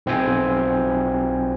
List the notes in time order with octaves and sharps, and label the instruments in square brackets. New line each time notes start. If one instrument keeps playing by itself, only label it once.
[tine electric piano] B1 C4 F4 G5 G#5